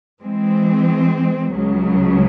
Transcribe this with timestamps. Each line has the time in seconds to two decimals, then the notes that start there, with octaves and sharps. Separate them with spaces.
0.20 E3 G#3 C4
1.51 C#2 C#3 F#3